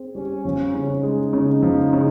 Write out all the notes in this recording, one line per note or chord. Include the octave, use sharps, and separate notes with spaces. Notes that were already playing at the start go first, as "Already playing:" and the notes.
Already playing: C4 G#4
G3 C#4
F3 C#4
C#3
D#4
G#3
C#3
F3
C#3